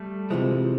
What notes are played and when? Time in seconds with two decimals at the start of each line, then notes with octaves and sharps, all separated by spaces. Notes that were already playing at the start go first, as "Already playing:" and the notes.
Already playing: G3 A3
0.30 C3 E3 F3 G#3